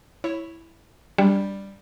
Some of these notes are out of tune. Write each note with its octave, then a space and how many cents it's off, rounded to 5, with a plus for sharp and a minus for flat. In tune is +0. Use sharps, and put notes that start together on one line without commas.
E4 +0 C#5 -5
G3 +5 D4 -10